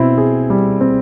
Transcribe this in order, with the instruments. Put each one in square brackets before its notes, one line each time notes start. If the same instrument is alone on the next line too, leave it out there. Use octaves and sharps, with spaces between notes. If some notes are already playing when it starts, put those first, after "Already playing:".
Already playing: [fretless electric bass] B2 [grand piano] C4 E4
[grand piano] G#4
G3
C4